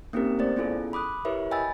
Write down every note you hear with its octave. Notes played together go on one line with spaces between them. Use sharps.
A#3 C4 C#4 D#4 G4 A#4
A3 C5 D5 A6
B3 C#4 E4 F4 G#4 A4
B5 D6 D#6 F#6
E4 G4 A#4 B4 C#5 E5
D#5 G5 G#5 B5 E6 A6